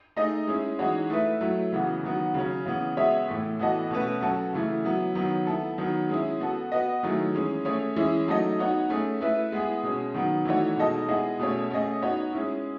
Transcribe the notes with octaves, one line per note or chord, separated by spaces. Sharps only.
A3 D#4 G#4 D#5
G#3 C#4 E4
E3 G#3 D#4 F#4 C#5
A3 E4 B4 E5
F#3 A3 E4
C#3 E3 B3 F#4
D#3 F#3 B3 F#4
C#3 F#3 C#4
C#3 E3 B3
G#3 B3 F#4 C#5 E5
A2 E3 A3
E3 B3 F#4 A4 D#5
B2 A3 C#4 F#4 B4
F#3 C#4 F#4 A4
C#3 E3 A3 E4
F#3 B3 E4
D#3 F#3 B3
B3 E4 A4
D#3 F#3 B3
G#3 C#4 E4
B3 F#4 A4
B3 F#4 B4 D#5
D#3 F#3 A3 E4 G#4
E3 G#3 C#4
A3 C#4 G#4 C#5
E3 G#3 C#4 E4
F#3 A3 D#4 A4 D#5
B3 D#4 F#4 C#5
A3 C#4 G#4
A3 E4 B4 E5
G#3 B3 E4 G#4
B2 G#3 C#4
D#3 F#3 B3
E3 A3 D#4 F#4 C#5
B2 G#3 D#4 A4 D#5
G#3 B3 E4 G#4 D#5
B2 A3 C#4 G#4 C#5
A3 C#4 G#4 D#5
B3 D#4 F#4 C#5
G#3 C#4 E4